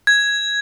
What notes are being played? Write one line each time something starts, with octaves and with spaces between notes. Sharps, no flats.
G#6